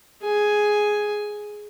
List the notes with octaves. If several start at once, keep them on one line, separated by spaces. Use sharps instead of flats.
G#4 G#5